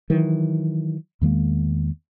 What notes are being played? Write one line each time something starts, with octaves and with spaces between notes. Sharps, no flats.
D#3 E3 F#3
E2 D#3 G#3 A#3